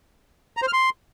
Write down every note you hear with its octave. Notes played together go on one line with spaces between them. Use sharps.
A#5
C5
F6
C6